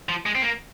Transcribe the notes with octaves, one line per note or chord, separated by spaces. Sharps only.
F3
G#3
C4
A#3